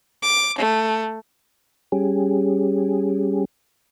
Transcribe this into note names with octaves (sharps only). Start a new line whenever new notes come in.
D6
A3
G3 C#4 G4 G#4